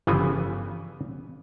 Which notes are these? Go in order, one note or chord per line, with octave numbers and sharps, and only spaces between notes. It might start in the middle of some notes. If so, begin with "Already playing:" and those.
G1 C#3 E3 F3 B3 G#5